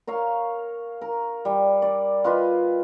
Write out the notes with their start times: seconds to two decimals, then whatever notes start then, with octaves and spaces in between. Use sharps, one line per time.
0.07 A#4 C#5 F5
1.01 A#4
1.45 G3
1.82 D5
2.24 F4 B4 D#5